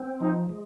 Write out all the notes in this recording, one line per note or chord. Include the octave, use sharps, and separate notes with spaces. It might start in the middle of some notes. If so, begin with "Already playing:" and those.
Already playing: C4
F3 D#4
G#3